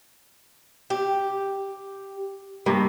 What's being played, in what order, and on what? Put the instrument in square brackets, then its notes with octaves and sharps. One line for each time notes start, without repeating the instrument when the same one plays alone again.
[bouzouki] G4
[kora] G2 A#3 [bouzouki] C3